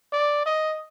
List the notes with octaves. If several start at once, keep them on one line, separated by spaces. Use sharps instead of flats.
D5
D#5